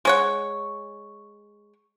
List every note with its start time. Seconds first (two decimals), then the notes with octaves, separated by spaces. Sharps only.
0.05 G#3 C#5 F#5